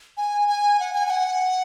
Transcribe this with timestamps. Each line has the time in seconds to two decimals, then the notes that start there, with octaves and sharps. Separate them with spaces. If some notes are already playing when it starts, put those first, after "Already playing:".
0.17 G#5
0.48 G#5
0.80 F#5
0.93 G#5
1.06 G#5
1.10 F#5